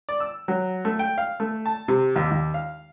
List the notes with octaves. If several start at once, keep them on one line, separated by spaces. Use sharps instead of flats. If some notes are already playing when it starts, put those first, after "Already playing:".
D5
E6
F#3
A3
G5
F5
A3
A5
C3
D#2
D#2
F5